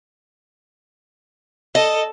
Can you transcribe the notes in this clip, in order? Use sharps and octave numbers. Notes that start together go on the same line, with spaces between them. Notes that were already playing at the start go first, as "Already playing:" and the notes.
A4 D#5